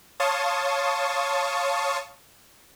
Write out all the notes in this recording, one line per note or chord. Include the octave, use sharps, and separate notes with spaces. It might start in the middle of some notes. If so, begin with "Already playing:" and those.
C#5 F5 A5 C6 C#6 D#6